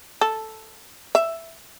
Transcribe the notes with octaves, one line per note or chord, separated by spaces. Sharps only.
A4
E5